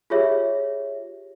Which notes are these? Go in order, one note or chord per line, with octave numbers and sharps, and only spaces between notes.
F4 G4 G#4 C#5 E5